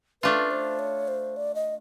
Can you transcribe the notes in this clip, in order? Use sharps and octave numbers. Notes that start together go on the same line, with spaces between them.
A3 D4 F4 B4
C5
C#5
C5
D5
D#5